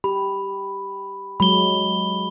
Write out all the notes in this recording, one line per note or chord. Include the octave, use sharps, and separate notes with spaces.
G4 B5
F#3 G#3 B5 G7